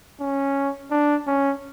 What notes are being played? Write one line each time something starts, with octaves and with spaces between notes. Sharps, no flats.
C#4
D4
C#4